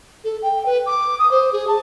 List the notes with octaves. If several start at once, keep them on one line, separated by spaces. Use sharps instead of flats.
A4
G5
B4
D6
D#6
C5
G#4
A5